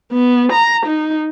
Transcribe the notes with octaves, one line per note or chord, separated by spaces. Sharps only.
B3
A#5
D#4